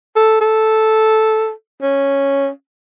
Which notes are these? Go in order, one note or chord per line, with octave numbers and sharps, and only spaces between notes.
A4
A4
C#4